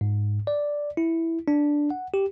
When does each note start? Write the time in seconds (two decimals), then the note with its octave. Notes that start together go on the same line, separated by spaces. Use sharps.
0.01 G#2
0.47 D5
0.97 E4
1.48 D4
1.91 F#5
2.14 G4